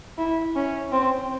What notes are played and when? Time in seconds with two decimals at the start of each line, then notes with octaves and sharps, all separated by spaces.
0.18 E4
0.56 C#4
0.92 C4